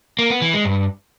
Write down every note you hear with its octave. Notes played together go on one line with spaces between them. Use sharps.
A#3
B3
E3
G#3
G2